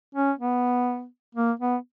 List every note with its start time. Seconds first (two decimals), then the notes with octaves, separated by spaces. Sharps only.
0.15 C#4
0.39 B3
1.35 A#3
1.60 B3